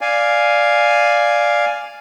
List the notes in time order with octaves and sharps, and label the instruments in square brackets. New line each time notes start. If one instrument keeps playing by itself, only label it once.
[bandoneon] D5 F5 G#5